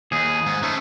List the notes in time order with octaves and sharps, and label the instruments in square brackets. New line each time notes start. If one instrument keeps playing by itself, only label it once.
[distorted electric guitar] D#2 [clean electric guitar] G#4
[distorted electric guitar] G#2
[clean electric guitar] A3 [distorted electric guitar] C#4 C5